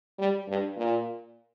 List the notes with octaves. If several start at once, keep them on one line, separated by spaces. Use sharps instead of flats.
G3
G2
A#2